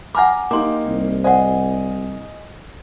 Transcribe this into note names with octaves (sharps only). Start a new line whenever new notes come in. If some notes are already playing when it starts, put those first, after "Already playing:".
F#5 G#5 A#5 D6 F6 A#6
A#3 D#4 G4 C6 D6
C2
C5 D5 D#5 F#5 G#5